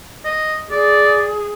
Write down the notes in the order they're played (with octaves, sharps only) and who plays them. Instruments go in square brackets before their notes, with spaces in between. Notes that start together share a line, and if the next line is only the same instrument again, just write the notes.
[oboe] D#5
[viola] G#4 [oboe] D5